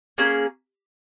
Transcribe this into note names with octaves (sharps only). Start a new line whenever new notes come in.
A#3 C#4 G#4